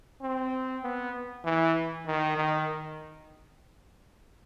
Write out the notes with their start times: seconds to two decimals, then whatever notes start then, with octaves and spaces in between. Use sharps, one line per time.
0.22 C4
0.84 B3
1.45 E3
2.07 D#3
2.37 D#3